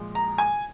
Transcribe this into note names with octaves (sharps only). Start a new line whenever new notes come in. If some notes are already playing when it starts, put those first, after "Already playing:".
Already playing: A#2 F3 G#3
A#5
G#5